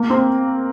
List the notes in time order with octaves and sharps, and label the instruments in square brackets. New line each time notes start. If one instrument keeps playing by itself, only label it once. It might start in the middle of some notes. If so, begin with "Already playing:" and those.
Already playing: [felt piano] A#3
C4